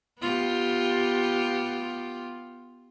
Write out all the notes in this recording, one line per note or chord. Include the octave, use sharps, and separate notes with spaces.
B3 F4 G4